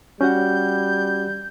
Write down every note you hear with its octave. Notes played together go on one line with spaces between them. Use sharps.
G3 C#4 F#4 F#5 G6